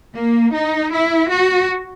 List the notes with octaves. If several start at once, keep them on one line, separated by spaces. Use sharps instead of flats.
A#3
D#4
E4
F#4